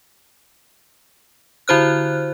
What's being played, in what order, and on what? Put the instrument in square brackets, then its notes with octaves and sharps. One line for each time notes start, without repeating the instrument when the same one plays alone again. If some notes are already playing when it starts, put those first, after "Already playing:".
[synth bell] D3 E4 F#4 C5 F6 F#6